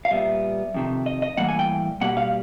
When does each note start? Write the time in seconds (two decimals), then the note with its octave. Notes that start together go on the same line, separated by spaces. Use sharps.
0.05 F5
0.11 A#2 G3 B3 E5
0.74 F2 C3 D#3
1.06 D#5
1.22 D#5
1.37 A2 E3 G3 A#3 F#5
1.49 G#5
1.59 G5
2.01 B2 G3 A#3 F#5
2.17 F5